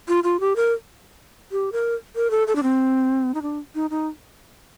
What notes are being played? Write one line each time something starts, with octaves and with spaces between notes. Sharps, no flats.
F4
F4
G4
A#4
G4
A#4
A#4
A4
A4
D4
C4
D#4
D4
D#4
D#4